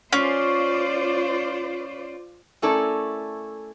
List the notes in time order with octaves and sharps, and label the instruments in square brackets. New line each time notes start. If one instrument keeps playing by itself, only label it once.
[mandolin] C#4 [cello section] F4 C5 D5
[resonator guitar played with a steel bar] A3 C#4 E4 A4 A#4 D5